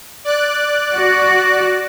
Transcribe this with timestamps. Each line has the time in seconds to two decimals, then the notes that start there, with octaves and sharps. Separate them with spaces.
0.24 D5 F#6
0.94 F#4